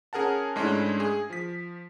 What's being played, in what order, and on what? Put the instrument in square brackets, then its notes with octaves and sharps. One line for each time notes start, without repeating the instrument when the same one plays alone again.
[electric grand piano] C#4 G#4 A#4 F#5 A5
G#2 G#3 A3 C#4 D4 E4
G#4
F3 B6